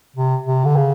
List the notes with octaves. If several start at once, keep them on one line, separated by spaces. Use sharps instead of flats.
C3
C3
D3
C#3